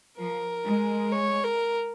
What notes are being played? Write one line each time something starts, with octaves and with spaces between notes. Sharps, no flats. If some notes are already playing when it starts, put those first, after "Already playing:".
F3 A#4
G#3
C#5
A#4